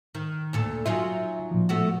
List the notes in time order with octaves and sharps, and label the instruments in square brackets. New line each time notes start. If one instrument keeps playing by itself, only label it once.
[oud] D#3
D2 A#2 A4
[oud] F#3 D#4 F4 [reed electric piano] E5 G#5
[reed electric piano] A#2 F3
[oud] A3 B3 F#4